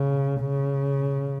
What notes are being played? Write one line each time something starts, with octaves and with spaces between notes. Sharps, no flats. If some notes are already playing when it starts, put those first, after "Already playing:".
Already playing: C#3
C#3